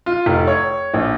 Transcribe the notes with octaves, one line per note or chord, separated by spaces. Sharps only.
F4
F1
C#5
A#1